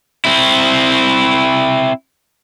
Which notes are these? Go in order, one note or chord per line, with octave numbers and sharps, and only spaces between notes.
C4 E4